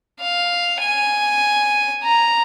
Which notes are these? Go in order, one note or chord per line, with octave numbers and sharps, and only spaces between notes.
F5
G#5
A#5